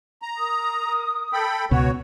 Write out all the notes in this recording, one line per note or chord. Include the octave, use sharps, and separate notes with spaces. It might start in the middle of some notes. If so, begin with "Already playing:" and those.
A#5
A#4 D#6
A4 G5 B5
C#2 B2 F#4 C#5